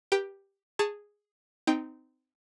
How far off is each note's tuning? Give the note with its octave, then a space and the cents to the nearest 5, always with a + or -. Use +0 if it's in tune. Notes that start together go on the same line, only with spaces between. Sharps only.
G4 +5 B4 -35 G5 +0
G#4 -5 A5 +15 C#6 +0
C4 -25 D#4 +0 G5 +0